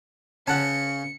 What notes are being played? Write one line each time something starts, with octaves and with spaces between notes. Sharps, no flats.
C#3 C#4 F#5 A5 C#7